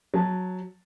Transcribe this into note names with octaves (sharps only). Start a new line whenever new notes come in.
F#3 A5